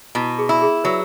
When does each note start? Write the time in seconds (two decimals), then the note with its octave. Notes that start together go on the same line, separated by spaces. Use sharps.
0.15 B2 E4
0.38 G#4
0.49 E4
0.62 G#4
0.84 F#3 B4